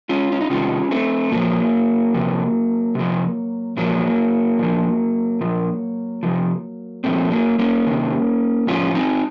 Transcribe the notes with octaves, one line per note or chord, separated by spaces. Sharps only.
C#4 F4
C#4
D#4
C3 D#3 C#4 F4
A3 C4
A#2 F3 F#3 A#3
C3 F3
C3 F3
A#2 F3 F#3 A#3
A#2 F3
A#2 F3
C3 F3
A#2 F3 A3 C4
F#3 A#3
A#3 C#4
C3 D#3
A2 F3 C#4 F4
C4 D#4